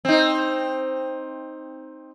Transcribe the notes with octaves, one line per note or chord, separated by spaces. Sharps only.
C4 D#4